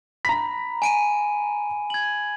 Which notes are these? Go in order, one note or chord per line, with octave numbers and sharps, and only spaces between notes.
A#5 B5 B6
G#5 D7 D#7
G#6 F#7